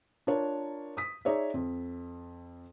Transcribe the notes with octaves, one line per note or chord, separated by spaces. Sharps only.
D4 F4 A#4 C#5
D#6 B6
D#4 G#4 C#5 D5 E5
F2